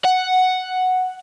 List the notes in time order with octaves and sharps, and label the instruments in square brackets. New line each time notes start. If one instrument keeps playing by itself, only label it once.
[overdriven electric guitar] F#5